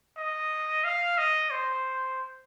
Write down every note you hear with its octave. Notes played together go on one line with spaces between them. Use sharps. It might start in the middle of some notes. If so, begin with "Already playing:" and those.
D#5
F5
D#5
C5